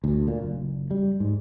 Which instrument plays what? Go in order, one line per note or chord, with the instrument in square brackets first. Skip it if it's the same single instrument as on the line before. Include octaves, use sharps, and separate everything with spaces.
[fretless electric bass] D2
A#2
F#1
G3
G#2